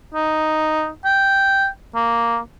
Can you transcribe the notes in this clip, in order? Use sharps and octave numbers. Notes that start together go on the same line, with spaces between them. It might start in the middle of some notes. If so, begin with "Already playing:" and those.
D#4
G5
A#3